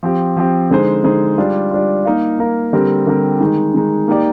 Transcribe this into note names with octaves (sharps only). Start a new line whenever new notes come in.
F3 C4 G4
F3 C4 G4
D3 G#3 D#4 G#4 C5
D3 G#3 D#4 G#4 C5
G3 D4 F4
G3 D4 F4
A#3 D#4 A#4 F5
A#3 D#4 A#4 F5
D3 G3 C4 G4 A#4
D3 G3 C4 G4 A#4
D#3 G#3 D#4
D#3 G#3 D#4
A#3 D#4 G4 D5